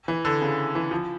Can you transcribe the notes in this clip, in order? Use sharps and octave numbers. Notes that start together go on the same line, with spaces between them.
E3
D3
C#3
E3
F3